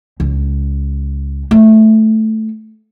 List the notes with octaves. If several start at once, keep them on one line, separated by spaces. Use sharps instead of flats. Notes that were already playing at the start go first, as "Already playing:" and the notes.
C#2
A3